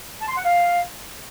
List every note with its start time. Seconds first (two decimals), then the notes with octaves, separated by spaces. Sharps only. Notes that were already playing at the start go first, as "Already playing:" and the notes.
0.20 A5
0.28 C6
0.36 F#5
0.43 F5